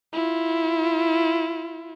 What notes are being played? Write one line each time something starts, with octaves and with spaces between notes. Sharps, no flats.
E4 F4